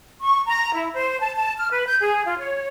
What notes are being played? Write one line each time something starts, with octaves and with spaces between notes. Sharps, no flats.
C#6
A#5
E4
C5
A5
A5
F6
B4
G6
G#4
F4
C#5